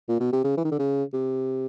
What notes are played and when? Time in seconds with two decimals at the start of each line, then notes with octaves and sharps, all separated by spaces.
0.09 A#2
0.20 B2
0.32 C3
0.44 C#3
0.57 E3
0.65 D#3
0.72 D3
0.79 C#3
1.13 C3